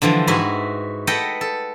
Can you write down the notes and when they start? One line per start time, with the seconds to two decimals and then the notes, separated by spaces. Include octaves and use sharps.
0.02 D3 E3 F3 G3
0.27 G#2 E4 F#4 B4
1.07 A4 B4 D#5 F#5 G5
1.41 A4